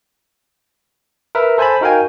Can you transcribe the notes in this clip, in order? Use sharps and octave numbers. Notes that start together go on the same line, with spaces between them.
A#4 B4 E5
A4 C5 G#5 A5 B5
D#4 F#4 A#4 F5 G5 G#5